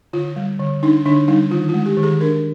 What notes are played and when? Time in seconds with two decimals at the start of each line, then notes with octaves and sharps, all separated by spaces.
0.13 D3 F4
0.36 G3
0.60 D3
0.83 D4 D#4
1.06 D3 D4
1.28 G3 D#4
1.51 D#3 F4
1.69 G#3 F4
1.86 G4
1.97 D#3
2.03 G#4
2.21 D4 A#4